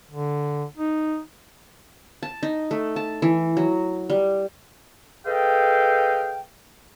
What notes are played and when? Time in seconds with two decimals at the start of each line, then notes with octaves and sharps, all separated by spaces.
0.11 D3
0.77 D#4
2.23 A5
2.43 D#4
2.71 A3
2.96 A5
3.22 E3
3.57 F#3
4.10 G3
5.26 G#4 A4 B4 D#5 F5 G5